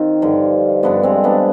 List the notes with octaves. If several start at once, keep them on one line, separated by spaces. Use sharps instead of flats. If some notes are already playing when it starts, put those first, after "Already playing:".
Already playing: D#3 C4 D#4 F4 G4
G2 D3 F3
G2 D3 F3 B3 D4
G#3 C4
B3 D4